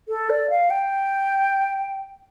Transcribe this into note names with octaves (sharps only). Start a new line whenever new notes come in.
A4
D5
F5
G5